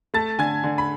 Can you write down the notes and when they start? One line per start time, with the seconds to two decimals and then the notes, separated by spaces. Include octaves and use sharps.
0.14 A3 A5 A6
0.39 D3 G#5 G#6
0.64 D3
0.78 B5